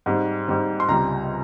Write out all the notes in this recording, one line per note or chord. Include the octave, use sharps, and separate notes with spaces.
G#2 G3 C4
G#2 G3 C4
C6
C#2 C3 G3 A#5